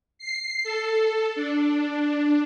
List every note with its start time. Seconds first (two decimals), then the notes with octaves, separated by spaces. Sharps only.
0.19 C7
0.64 A4
1.35 D4